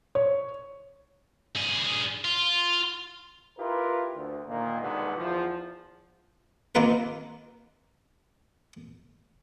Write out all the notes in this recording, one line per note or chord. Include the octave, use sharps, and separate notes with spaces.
C#5
G2 G#4
F4
E4 F4 G4 A#4 B4
D2
A#2 D#3 A#3
C2 B2 D3 D#3 G#3 B3
E2 F3
D#3 A#3 C4 F4 A#4 B4